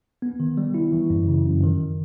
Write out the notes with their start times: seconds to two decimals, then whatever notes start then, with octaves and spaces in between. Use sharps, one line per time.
0.22 B3
0.40 D#3
0.57 G3
0.74 E4
0.93 E3
1.10 F#2
1.27 C#3
1.46 F#2
1.63 D#3